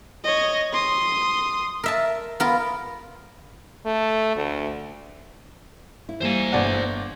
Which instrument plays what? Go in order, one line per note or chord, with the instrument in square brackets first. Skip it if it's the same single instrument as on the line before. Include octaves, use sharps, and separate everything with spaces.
[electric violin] C#5 D#5
C6 D#6
[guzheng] A#4 E5 A5
B3 F4 A#4
[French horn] A3
D2
[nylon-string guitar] E4
[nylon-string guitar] E3 G3 A#3 [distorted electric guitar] C5 G#5
[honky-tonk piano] G1 D5 F#5